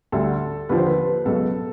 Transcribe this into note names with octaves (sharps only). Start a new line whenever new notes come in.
D2 D3 G3 A4
D#2 D3 F3 B4
C5
B4
C#2 B2 F#3 A4